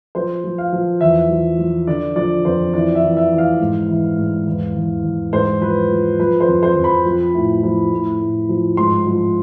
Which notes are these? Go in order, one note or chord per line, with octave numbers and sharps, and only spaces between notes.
F3 C5
F3
F5
F3
E2 E5
F3
F3
D3 D5
F3 D5
F2 C5
E3 D5
E5
E3
E5
E3
F5
G#2
E3
G#2
E2
E2
E2
G#2 C5
F3 B4
F3
F3 B4
C5
F2
C5
F2
B5
F3
A2
F3
A2
A2
F3
G#2 C6
F3